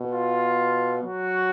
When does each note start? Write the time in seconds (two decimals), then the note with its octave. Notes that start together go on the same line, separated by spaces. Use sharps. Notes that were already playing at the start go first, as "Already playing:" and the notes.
Already playing: B2
0.11 F4
1.03 F#3 F#4